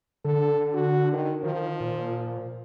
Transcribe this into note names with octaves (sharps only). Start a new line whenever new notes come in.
D3 A4
F#4
D#3
D#3 F3
A#2